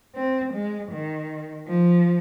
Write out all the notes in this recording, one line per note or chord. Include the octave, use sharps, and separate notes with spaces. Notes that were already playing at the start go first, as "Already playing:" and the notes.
C4
G#3
D#3
F3